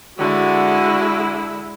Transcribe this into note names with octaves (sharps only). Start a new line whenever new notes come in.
D3 G#3 E4 F#4